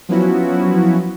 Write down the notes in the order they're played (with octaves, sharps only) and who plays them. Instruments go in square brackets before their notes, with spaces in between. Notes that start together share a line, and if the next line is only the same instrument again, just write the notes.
[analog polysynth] F3 F#3 B3 C#4 E4 F#4